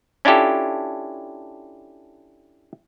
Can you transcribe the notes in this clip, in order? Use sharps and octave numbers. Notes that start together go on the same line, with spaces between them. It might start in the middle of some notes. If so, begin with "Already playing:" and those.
C#4 D4 E4 F4 G4 A4